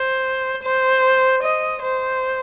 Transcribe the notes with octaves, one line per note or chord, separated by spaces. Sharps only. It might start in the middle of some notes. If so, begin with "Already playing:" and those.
Already playing: C5
C5
D#5
C5